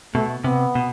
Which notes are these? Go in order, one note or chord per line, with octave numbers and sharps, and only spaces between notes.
B2 A3
C3 B3
B2